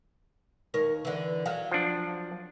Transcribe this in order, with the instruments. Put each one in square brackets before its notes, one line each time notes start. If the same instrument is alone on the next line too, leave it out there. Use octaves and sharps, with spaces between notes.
[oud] D#2 A#4 C#5
D3 E3
[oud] F#3 [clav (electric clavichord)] F5
[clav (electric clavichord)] F3 D4